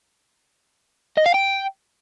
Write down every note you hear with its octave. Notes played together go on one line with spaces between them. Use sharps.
D#5
F5
G5